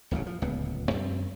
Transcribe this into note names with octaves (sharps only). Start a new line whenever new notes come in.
D#1 A1 D2 C#3
F3
D1 C#2 A#2 B3
F#2 C4